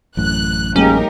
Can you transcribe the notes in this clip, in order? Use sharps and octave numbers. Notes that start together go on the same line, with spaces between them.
A1 F#2 A2 F#6
F#3 G#3 A#3 C#4 D#4 G4 A#4